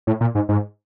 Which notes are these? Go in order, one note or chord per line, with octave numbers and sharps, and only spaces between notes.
A2
A#2
G#2
G#2